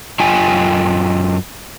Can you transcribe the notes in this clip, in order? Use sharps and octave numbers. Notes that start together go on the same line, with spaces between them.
F#2 F4 D#5 G5 G#5